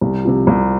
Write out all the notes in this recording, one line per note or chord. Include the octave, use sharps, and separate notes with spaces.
C2
C3 F3
C2